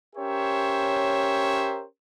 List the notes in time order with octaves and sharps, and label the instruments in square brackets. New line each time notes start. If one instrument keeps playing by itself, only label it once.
[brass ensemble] C#4 G4 A#4 C5 C#5 E5